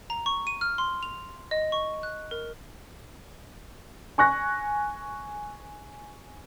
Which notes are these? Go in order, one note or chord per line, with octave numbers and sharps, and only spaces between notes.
A#5
C#6
D#7
F6
C6
F7
D#5
C#6
F#6
A#4
G#5 C#6 F#6 A#6